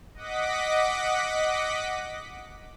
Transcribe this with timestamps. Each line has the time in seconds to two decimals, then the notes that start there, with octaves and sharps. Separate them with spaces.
0.14 D#5 F#5 D6 B6